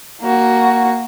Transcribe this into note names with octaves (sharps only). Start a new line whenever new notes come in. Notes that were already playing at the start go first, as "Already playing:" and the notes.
A#3 F#4